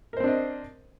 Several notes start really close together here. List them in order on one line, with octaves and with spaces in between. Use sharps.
A#4 C5 C4 D4 D#5